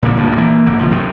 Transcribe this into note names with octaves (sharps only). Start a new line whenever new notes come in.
A#2 D3 E3
D2 G2 A#2
E3 A#3
G#1 D3 A#3
D1 B2 F3
F#2 C3 D#3